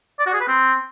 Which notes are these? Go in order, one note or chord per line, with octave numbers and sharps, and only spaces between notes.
D5
F#4
G#4
B4
C4